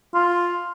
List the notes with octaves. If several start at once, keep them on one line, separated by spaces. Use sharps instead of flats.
F4